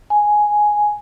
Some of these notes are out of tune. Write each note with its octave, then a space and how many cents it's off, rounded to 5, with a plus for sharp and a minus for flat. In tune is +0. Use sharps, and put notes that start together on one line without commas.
G#5 +5